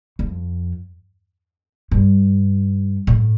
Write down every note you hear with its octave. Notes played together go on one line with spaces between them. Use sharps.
F2
G2
A2